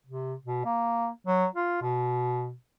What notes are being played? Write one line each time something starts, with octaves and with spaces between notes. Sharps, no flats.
C3
B2
A#3
F#3
F4
B2